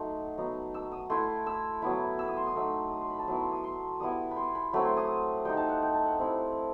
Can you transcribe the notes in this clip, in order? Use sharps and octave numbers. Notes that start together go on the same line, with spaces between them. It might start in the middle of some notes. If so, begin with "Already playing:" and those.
Already playing: F#3 A3 D#4 C6
F#3 B3 D#4
E6
D#6
A3 E4 C6
E6
F#3 B3 E4
E6
D#6
C6
D#6
F#3 A3 D#4 E6
D#6
C6
B5
A5
F#3 B3 E4 B5
C6
D#6
C6
G3 B3 E4 D#6
B5
C6
B5
F#3 A3 C4 E4 B5
C6
D#6
G3 D#4 G5
A5
F#5
G5
A5
F#5
G3 C4 E4